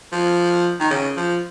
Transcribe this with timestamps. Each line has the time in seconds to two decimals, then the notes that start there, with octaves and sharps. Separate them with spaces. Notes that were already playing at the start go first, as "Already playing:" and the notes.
0.12 F3
0.80 D#3
0.90 C#3
1.17 F3